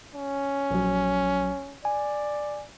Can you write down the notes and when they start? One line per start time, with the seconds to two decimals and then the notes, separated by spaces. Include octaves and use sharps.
0.15 C#4
0.71 A#1 F#3
1.85 D5 G#5